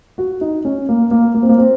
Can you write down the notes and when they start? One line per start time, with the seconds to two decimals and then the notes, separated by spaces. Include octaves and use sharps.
0.18 F#4
0.41 D#4
0.65 C#4
0.89 A#3
1.11 A#3
1.35 A#3
1.42 C4
1.49 A#3
1.58 C4